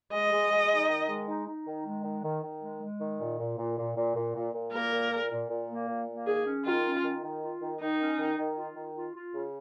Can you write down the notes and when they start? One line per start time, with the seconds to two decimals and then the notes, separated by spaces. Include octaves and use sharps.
0.13 G#3 D#5
0.32 G#3
0.51 G#3
0.71 D#4
0.89 D#3
1.08 G#3
1.28 D#4
1.47 D#4
1.67 D#3
1.86 G#3
2.04 D#3
2.24 D#3
2.43 D#3
2.62 G#3
2.82 G#3
3.01 D#3
3.20 A#2
3.39 A#2
3.58 A#2
3.77 A#2
3.96 A#2
4.16 A#2
4.36 A#2
4.54 A#2
4.73 A#3 A#4
4.93 A#2
5.11 A#2
5.31 A#2
5.50 A#2
5.69 A#3
5.89 A#2
6.08 A#3
6.27 D#3 G#4
6.46 C#4
6.65 D#3 F4
6.85 C#4
7.04 D#3
7.24 D#3
7.42 F4
7.61 D#3
7.81 D#3 D#4
8.00 C#4
8.19 D#3
8.38 D#3
8.57 F4
8.76 D#3
8.96 F4
9.15 F4
9.34 C#3